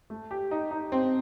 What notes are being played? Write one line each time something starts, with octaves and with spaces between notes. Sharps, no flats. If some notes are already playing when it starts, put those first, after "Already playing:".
A3
G4
D#4
D#4
C4